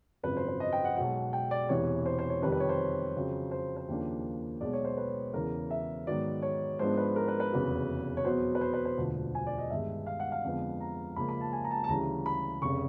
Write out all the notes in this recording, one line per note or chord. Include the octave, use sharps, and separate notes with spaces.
G#1 F#2 C#3 F3 B4
C5
B4
D#5
G5
F#5
B1 B2 G#3 F#5
G5
D5
E1 E2 C3 E3 C#5
C5
C5
C#5
F2 C3 D#3 G3 B4
B4
C#5
C5
F2 C#3 F#3
C5
C5
D#2 C#3 F3 A#3 D4
B1 B2 G#3 D5
C#5
C5
B4
E2 C#3 E3 A#4
E5
G#2 D#3 F#3 B3 D5
C#5
G#2 F3 G#3 B3 D4 C5
B4
A#4
B4
B4
F1 E2 C#3 F#3
C#5
E2 B2 F#3 B3 C5
B4
C5
B4
C5
E1 D2 D3 F3
G#5
D5
D#5
G1 G2 D#3 G#3 E5
F5
F#5
F5
F2 D3 F3 G#3 B3
A#5
C#2 C#3 F3 A#3 B5
B5
A5
G#5
A#5
A5
A5
D2 C#3 E3 G3 A#5
B5
F1 C#3 C#6